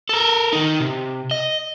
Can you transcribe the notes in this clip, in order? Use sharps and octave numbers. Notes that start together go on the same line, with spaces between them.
A4 A#4
D#3 D#4
C3
D#5